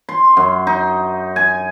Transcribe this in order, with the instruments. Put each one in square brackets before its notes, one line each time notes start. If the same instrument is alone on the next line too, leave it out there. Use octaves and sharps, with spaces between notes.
[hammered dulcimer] C6
F#2
D#4
G#5